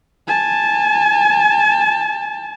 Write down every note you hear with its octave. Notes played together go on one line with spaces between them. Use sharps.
G#5 A5